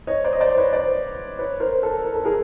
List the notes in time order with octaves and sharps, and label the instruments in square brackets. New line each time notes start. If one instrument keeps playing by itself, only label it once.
[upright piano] C#5 D#5
C5 D5
D#5
C5 D5
B4 C#5
C5 D5
B4 C#5
A#4 C5
A4
A#4
A4
G#4 A#4